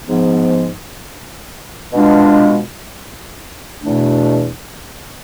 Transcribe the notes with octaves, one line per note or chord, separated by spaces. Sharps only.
G#2 F3 B3
B2 G#3 D4 F4
E2 B2 A3 D4